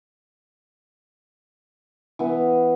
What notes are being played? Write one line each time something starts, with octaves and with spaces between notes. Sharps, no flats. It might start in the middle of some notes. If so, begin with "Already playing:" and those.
E3 B3